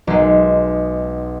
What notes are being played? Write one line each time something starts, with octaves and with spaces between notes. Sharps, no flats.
B1 G#3